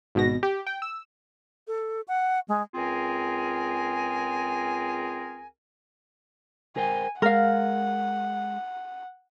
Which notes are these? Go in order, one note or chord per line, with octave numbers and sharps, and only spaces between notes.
G#1 B2 A#6
G4
G5
E6
A4
F#5
G#3
C#2 C4 F4 G#4 A#4 G#5
A#4 C5 G5 G#5
G#3 A#4 F5 F#5